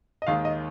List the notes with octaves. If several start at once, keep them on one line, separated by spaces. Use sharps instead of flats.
D#5
D#2 D#3 G#3 F5
D#5